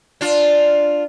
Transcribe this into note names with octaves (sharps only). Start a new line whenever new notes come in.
D4 F4